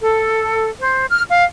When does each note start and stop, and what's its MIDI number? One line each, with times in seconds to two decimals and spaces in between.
0.01 0.69 69
0.80 1.06 72
1.09 1.22 89
1.30 1.44 77